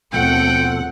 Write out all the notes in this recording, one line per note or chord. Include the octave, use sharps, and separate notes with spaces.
D#2 B2 F3 A3 C4 A4 F#5 G5